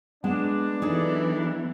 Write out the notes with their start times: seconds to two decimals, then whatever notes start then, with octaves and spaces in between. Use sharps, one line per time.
0.24 G#3 B3 D4
0.82 E3 F#3 D#4 G#4 A4